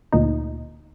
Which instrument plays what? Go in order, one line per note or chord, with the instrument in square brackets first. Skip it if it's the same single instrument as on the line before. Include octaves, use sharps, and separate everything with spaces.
[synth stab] D2 A#2 D#4